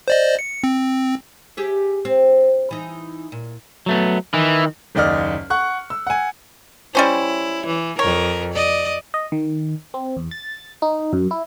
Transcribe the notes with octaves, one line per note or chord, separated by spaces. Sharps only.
C5 D5 D#5
C#7
C4
G4 G#4 E5
C4
E3 D#4
A#2
F#3 A3 B3
D#3 E3
F#1 D#2 D5 D#5 F6
F#5 C#6 F#6
E6
F#5 G#5
G3 C#4 E4 C5
E3
F2 A#4 C#5
D5 D#5
D#5
D#3
C4
E2
A6
D#4
F#2
E4